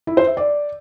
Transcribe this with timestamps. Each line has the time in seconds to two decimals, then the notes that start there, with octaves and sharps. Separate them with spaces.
0.07 E4
0.17 C5
0.27 E5
0.37 D5